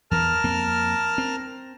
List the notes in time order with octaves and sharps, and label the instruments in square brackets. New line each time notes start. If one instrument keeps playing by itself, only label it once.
[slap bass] E2 E3 [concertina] A#4 A5 F6
[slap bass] F2 A#3 C4
C4